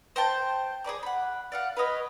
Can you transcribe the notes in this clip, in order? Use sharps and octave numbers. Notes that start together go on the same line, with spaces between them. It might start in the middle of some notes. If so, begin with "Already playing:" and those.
C5 G5 A5
G#4 B4 D5 D6
F#5 B5
D5 F5 F#5
B4 C#5 D#5 B5